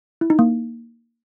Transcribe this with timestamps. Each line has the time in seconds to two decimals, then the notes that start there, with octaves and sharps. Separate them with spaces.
0.21 E4
0.30 D#4
0.39 A#3